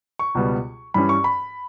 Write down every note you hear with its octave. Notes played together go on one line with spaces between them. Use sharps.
C#6
C#2 B2 G3 B3
G2 E3 G3 C#4 B5
C#6
B5